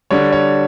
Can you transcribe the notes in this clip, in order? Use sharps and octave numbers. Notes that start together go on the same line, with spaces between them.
D3 G3 D4 C#5
C#5